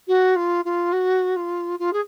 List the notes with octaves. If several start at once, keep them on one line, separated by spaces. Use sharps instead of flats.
F#4
F4
F4
F#4
F4
F4
G#4